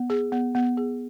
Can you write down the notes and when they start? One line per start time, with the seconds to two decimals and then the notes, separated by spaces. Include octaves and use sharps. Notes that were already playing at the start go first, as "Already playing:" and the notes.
Already playing: B3
0.10 G#4
0.32 B3
0.55 B3
0.77 G#4